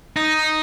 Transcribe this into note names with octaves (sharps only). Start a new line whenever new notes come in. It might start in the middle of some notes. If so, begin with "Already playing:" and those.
D#4